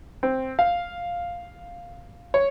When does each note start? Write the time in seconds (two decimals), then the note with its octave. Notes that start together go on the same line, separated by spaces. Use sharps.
0.23 C4
0.59 F5
2.34 C#5